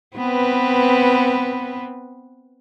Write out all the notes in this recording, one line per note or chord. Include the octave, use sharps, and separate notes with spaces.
B3 C4 B4